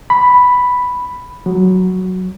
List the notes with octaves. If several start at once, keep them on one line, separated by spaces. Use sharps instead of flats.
B5
F#3